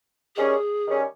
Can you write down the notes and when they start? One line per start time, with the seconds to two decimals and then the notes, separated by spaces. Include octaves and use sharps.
0.36 D#3 G3 C#4 G#4
0.87 D#3 G3 C#4